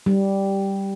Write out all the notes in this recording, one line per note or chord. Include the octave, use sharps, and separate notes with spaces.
G3